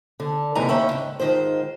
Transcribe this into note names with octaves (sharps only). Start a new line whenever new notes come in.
D3
D#2 G#2 C3 E3 G#5 A#5
D#2 C#3 C#4 C#5 E5 G5
G#2
G#2 C3 D#3 F4 C5